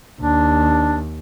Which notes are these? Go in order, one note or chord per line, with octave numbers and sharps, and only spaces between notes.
D#2 D4